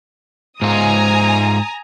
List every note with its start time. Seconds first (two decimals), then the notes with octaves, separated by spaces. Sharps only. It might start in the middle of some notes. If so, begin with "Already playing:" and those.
0.62 G#2 F4 G#5 A#5 D#6